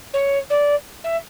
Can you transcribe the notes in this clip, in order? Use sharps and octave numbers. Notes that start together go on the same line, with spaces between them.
C#5
D5
E5